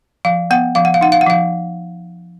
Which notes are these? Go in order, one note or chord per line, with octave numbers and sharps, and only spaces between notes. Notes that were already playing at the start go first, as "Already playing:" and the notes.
F3 F5
B3 F#5
F3 F5
F#5
F5
D#4 F#5
F5
F#5
F3 F5